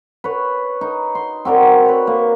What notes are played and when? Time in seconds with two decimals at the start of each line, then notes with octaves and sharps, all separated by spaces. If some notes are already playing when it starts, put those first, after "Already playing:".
0.24 B4 C#5
0.81 D#4
1.15 C6
1.45 C4 F#4 A#4 D5
1.86 B4 C#5
2.07 A#3